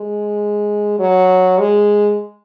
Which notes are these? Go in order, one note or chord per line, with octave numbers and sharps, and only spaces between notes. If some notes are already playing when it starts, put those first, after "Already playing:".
Already playing: G#3
F#3
G#3